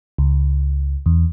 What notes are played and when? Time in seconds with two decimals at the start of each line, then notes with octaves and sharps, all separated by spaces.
0.18 C#2
1.06 E2